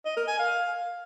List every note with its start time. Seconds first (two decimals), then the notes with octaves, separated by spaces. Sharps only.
0.05 D#5
0.17 A#4
0.28 G#5
0.39 F5